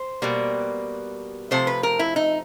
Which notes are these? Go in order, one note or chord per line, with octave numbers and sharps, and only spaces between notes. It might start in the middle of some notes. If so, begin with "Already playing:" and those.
Already playing: C5
B2 G3 A#3
C3 F3 A3 C5
B4
A#4
E4
D#4